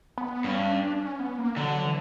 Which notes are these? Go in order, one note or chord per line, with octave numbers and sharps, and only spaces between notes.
B3
G2 C#4
D4
C#4
B3
A#3
D3 F#3
E3